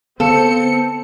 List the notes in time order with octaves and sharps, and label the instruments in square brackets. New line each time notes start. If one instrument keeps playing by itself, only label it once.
[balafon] D3 F5 [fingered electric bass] B3 [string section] C4 C#7 [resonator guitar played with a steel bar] A4